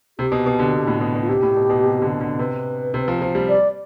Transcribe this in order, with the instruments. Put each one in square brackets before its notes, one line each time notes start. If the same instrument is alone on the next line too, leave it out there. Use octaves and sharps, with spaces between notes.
[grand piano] C3 [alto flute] G4
[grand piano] B2
B2
D3
B2
A2
B2
B2
[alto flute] F4
[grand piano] C3 [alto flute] G4
[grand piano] A2
B2
B2
C3
D3
D3
[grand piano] C3 [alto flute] B4
[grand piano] C3
F3
F3
G3
[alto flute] D5